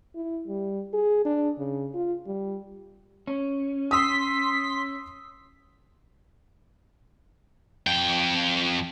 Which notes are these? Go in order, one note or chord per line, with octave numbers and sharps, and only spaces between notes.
E4
G3
G#4
D4
C#3
F4
G3
C#4
C6 D#6 E6 B6
F2 G5